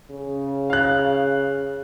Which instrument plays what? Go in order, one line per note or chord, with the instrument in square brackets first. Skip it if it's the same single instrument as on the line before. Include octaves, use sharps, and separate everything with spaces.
[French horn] C#3
[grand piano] F5 F#6